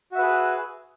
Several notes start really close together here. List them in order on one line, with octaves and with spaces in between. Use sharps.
F#4 E5 B4 G#4